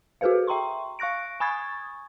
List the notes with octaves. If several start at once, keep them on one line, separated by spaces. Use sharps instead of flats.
F#4 G#4 A4 B4 C5 F5
E5 G5 A#5 C6 C#6
F5 C#6 F#6 A#6 D7
G#5 B5 C#6 D#6 G#6 A6